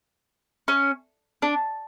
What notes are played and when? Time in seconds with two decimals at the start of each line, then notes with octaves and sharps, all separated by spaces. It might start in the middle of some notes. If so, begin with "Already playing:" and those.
0.68 C#4
1.42 D4